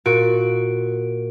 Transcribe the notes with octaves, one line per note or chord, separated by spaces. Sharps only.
A#2 F#4 D7